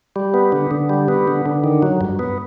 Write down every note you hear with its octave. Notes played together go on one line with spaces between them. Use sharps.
G3
B3
D3
D3
G3
B3
D3
D3
D#3
F#3
G2
B3